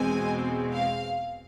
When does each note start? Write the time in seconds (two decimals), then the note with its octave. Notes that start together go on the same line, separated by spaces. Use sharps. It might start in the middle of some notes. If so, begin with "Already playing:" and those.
Already playing: E2 B2 G#3 C4 G#5
0.72 F5